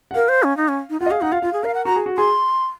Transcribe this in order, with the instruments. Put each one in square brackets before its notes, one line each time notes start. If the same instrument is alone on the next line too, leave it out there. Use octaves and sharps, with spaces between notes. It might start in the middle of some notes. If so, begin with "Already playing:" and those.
[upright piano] F#5
[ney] A#4 [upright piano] F5
[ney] C5
C#4
D#4
C#4
D#4
[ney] F4 [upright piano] F#5
[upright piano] D#5
[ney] G#4 [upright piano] F5
[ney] D#4 [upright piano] F#5
[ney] F4 [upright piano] F5
[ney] F4 [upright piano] F5
[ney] G#4
[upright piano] A#4 [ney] F5
[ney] F#5
[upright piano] F#4 [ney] A#5
[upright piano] G#4
F#4
[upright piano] G#4 [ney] C6